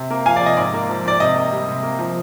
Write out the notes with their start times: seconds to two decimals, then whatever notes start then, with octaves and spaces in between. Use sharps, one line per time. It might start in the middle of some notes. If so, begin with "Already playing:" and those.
Already playing: C3
0.10 A#3
0.26 F3 F5 G#5
0.36 C3 D5
0.46 D#5
0.57 G#2 D5
0.74 A#3
0.89 F3
1.05 G#2 D5
1.20 C3 D#5
1.36 A#3
1.52 G3
1.68 C3
1.83 A#3
1.99 F3